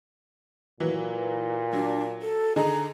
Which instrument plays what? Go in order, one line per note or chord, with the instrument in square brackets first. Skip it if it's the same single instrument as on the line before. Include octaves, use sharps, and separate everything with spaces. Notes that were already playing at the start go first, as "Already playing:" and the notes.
[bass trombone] A#2 [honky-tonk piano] E3 F#3
[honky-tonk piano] F#3 [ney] D4
[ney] A4
[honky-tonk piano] D3 D#4 G#4 [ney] A#5